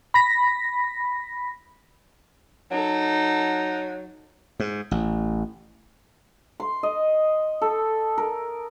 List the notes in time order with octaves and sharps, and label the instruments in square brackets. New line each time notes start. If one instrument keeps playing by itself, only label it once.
[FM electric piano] B5 A#6 B6
[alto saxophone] F#3 [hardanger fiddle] D#4 A4
[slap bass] G#2
A1
[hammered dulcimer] C6
D#5
A4
A#4